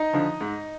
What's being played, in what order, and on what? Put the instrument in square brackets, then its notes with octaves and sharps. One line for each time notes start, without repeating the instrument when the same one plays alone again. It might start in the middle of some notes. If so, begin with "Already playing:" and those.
Already playing: [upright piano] D#4 D#5
D3 F3
G#2